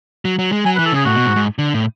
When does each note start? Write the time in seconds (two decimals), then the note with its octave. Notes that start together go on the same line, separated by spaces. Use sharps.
0.25 F#3
0.39 F#3
0.52 G#3
0.65 F#3 G#5
0.76 B4
0.79 E3
0.86 A4
0.92 C#3 G#4
1.05 A2 F#4
1.16 B2
1.26 G#2
1.36 G#2
1.58 D3
1.74 A2